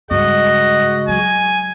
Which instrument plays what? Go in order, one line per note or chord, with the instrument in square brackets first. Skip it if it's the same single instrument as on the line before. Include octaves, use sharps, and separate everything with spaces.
[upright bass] G2 [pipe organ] C#3 G#3 F#4 [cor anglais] D#5 [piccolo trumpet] F#5
[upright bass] F#3 [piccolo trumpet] G#5